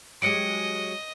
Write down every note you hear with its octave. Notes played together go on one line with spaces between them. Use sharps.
F#3 G#3 G4 D#5 C#7 D7